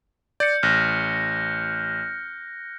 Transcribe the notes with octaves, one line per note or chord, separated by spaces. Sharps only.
D5 G6 C#7
A1 F6 F#6 A#6